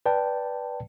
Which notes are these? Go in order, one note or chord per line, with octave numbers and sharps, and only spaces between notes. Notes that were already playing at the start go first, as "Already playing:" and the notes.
B4 D5 G5 A5